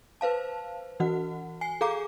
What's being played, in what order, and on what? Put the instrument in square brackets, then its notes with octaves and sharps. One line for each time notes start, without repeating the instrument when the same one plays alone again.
[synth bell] B4 C5 F5 A5
E3 F#4 F#5
G#5 C7
G#4 A4 F5 A#5 D6